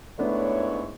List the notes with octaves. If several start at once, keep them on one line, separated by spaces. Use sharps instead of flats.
G#2 A3 B3 D4 E4 C#5